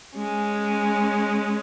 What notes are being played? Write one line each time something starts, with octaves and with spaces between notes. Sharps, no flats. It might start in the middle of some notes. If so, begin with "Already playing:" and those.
G#3 C#4